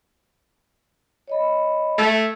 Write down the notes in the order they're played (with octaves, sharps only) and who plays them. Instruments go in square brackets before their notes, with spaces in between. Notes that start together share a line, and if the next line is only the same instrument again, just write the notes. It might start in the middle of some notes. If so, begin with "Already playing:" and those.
[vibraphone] C#5 D#5 B5
[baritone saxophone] A3 [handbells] E6 G#6 A6